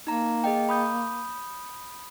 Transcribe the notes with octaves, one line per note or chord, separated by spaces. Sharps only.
A#3 D#4 A#5
G#4 D#5 G5
B5 D#6 G6